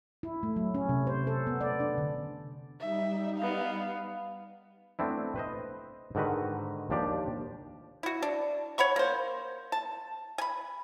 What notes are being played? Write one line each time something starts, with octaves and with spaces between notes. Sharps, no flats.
E4
A3
F#3
C#4
C3
C5
A4
B3
D5
D4
D3
G3 D#4 E5
B3 F5
A3 B3 C4 D4 E4
B4 C5 D#5
G#2 D3 D#3 F#4 B4
D#2 F3 D4 G4 D5
E4 F#4
D4
C#5 F#5 B5 C#6
A#3 C5
A5
G#5 B5